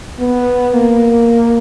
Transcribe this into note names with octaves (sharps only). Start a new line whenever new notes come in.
B3
A#3